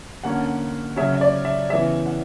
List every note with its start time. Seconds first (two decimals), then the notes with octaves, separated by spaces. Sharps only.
0.24 D3 A#3 C#4 F#5
0.96 C#3 F#3 C#4 E5
1.14 E5
1.21 D5
1.45 E5
1.70 C#3 E3 B3 E5
2.06 F#5